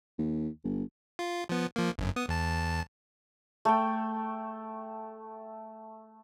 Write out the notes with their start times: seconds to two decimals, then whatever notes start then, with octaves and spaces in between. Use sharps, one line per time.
0.19 D#2
0.64 G1
1.19 F4
1.49 F3 B3
1.76 F3 A#3
1.98 G1 F#2
2.16 B3 D#6
2.28 E2 A5
3.65 A3 A4 G5